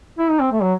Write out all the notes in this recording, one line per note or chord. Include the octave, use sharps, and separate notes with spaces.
E4
D#4
C4
A3
F#3